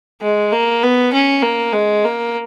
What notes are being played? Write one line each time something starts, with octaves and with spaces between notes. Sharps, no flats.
G#3
A#3
B3
C#4
A#3
G#3
A#3